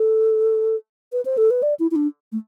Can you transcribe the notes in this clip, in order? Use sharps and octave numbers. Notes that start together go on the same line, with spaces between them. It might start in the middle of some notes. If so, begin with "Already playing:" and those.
Already playing: A4
B4
C5
A4
B4
D5
E4
E4
D4
A3